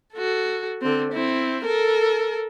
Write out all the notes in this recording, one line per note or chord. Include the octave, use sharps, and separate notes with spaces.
F#4 A4
D3 C4
C4 E4
A4 A#4